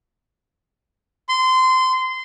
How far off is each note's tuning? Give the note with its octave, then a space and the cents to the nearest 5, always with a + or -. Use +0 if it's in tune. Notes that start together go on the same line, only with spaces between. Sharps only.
C6 -20